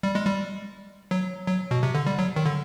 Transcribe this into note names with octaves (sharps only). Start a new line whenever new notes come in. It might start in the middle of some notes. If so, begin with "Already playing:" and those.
G3
G#3
G3
F#3
F#3
B2
C3
D3
G3
F#3
D#3
D3